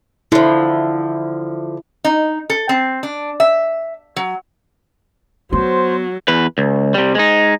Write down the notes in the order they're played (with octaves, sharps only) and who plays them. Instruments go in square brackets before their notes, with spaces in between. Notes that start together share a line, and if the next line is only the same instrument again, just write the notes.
[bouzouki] D3 F3 [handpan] E4
[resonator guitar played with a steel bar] D#4
A4
C4
D4
E5
F#3
[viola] F#3 [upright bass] B3 [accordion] C5
[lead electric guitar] E2 B4
C#2
C3 G3
G#3 D#4